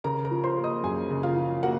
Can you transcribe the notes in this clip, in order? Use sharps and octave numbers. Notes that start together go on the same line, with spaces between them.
C#3 A#4 A#5
A#4 A#5
F3
C5 C6
A#3
D#5 D#6
F#2 G#4 G#5
C#3
F4 F5
F3
A#3 F#4 F#5